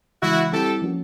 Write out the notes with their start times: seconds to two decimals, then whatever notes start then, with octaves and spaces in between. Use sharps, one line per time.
0.22 C#3 E3 G#3 E4 F#4
0.52 G3 C4 E4 G4 A4
0.82 F3 A#3 C#4 F#4